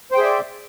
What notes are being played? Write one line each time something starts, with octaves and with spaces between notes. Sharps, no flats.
G#4 C5 D5 E5 G5